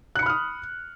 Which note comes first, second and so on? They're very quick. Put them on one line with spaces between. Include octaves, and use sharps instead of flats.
F#6 C#7 B5 F6 D#6